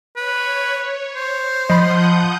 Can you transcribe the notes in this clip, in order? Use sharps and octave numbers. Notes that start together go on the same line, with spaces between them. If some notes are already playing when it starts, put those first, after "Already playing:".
B4 C#5
C5
F3 D#5 F#5 B5 C6 D#6 G6